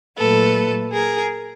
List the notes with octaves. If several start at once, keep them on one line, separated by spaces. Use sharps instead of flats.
A#2 F#3 A3 A4 B4
G#4 A#4